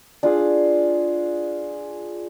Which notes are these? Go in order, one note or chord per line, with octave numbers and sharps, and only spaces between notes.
D4 F4 G#4